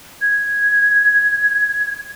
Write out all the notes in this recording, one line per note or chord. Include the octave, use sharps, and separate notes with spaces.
G#6